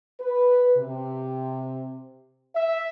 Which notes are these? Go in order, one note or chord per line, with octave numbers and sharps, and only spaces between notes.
B4
C3
E5